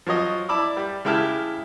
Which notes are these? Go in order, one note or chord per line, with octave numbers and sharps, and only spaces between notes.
F3 F#3 C#5 D#5
E4 D5 A5 B5 D6 E6
G3
C#3 G#3 E4 G4 A5 F6